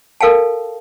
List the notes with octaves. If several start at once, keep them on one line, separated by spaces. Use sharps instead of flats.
A4 A#4 F5 G5 A5